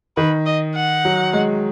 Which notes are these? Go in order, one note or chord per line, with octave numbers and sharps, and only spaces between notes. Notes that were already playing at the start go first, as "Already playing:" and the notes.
D#3 B4
D#5
F#5
F#3
G#3